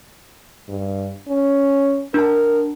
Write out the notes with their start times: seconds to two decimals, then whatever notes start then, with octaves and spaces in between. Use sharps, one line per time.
0.69 G2
1.28 C#4
2.14 D4 A#4 A5